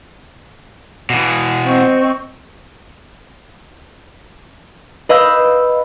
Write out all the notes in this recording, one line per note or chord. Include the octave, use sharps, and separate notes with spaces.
B2 E3
C4 D#5 C#6
B4 D#5 F5 B5 E6 G6